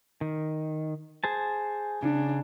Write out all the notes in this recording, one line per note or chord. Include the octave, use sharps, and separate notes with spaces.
D#3
G#4 C5 A5
C#3 D4